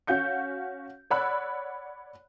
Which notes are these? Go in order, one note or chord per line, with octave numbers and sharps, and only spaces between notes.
C#4 F#4 F5 G6 C#7
C#5 D5 F#5 B5 E6 F#6